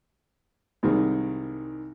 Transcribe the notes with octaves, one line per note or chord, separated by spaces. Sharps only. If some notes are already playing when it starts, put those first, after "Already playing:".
C2 D#3 G3 G#3